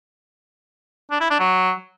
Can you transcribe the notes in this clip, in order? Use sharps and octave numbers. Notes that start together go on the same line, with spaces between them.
D4
E4
D4
F#3